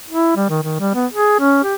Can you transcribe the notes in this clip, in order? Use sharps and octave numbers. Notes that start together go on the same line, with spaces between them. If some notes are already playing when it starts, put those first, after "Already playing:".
E4
G3
D#3
D#3
G3
B3
G#4
C#4
G4